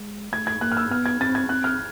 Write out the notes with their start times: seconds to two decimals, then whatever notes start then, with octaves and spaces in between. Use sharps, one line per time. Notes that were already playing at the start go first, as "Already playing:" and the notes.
Already playing: G#3
0.32 A3 G#6
0.47 G#6
0.61 A#3 F#6
0.72 F6
0.77 E6
0.91 B3 F6
1.06 G#6
1.21 C4 A6
1.35 G#6
1.49 C4 F#6
1.64 F6